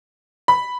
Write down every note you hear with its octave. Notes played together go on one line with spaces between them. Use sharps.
B5